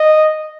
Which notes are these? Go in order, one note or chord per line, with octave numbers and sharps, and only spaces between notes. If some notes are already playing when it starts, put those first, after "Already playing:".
Already playing: D#5